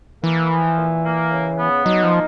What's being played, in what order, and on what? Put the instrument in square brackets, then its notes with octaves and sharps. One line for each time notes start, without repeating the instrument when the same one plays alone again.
[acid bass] E3 [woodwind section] A#3
[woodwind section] F3
A#2
A#3
C#3
B3
[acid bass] F#3 [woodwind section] D#4
[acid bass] F3
[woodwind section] A#3